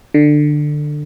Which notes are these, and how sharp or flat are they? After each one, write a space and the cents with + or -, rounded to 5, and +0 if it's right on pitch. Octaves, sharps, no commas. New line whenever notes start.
D3 +20